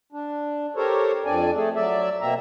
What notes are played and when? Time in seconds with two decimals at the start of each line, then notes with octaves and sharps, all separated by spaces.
0.13 D4
0.76 G4 A4 A#4 C5 C#5
1.25 F2 C4 D4 D5 G#5
1.55 A3 G#4 A4
1.76 F#3 D5 E5
2.21 B2 A#3 C4 E5 A#5